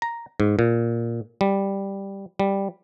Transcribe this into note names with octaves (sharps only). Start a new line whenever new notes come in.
A#5
G#2
A#2
G3
G3